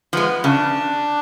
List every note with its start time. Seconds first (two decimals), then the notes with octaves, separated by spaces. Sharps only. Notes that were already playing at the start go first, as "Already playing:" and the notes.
0.13 F3 G#3 B3
0.44 C#3 D4